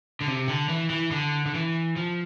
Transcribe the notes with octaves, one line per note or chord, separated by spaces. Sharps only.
D3
C3
D3
E3
E3
D3
D3
E3
F3